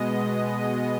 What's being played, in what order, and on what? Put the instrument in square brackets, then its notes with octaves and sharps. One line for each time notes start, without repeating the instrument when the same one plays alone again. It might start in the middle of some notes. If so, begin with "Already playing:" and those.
Already playing: [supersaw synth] B2 G#3 B3 D#5